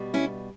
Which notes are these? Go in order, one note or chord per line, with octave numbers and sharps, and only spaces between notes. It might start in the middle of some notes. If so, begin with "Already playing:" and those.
Already playing: B2 G3
C#4 E4